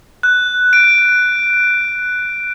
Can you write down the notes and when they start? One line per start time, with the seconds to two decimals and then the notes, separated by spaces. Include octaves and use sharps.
0.23 F#6
0.73 D7